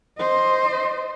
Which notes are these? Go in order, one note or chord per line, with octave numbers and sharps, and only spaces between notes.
C5 D#5